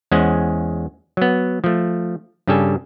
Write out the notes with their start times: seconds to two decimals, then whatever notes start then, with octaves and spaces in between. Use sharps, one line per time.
0.11 E2 G#3 C#4 C5 F#5 G#5
1.17 F#3 B3
1.64 F3 A3
2.47 G2 C#3 G3 G4 A4 G#5